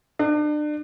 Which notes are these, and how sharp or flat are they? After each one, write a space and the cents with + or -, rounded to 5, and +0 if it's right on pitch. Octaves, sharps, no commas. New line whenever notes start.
D4 +35